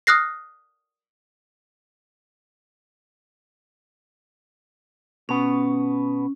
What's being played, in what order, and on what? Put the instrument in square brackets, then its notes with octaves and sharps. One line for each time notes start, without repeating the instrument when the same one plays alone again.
[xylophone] D#6 F6 F#6 A#6 C7
[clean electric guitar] B2 B3 [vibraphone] C#4